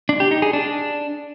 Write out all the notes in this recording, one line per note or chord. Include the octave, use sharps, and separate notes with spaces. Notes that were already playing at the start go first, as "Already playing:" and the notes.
D4
G4
D#4
G#4
D4